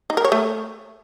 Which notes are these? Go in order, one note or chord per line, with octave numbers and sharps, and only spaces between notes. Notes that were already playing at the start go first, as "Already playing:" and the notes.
D#4
A#4
C#5
A3